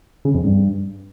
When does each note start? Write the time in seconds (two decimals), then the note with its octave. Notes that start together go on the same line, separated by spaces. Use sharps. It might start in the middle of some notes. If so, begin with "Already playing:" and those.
0.25 C#3
0.35 F2
0.44 G2